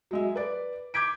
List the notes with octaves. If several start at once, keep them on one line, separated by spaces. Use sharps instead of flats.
F#3 G#3 E5
B4 D5
D6 G6 G#6 B6 D7